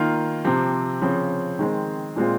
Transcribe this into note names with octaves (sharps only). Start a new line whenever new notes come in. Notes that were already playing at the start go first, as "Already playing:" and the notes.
Already playing: D#3 A#3 F4
C3 F3 C4 G4
C#3 F3 C4
D#3 G#3 C4
A#2 G#3 C4 F4